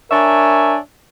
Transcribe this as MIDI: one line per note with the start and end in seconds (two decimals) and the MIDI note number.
0.10 0.76 62
0.10 0.76 70
0.10 0.76 73
0.10 0.76 76
0.10 0.76 80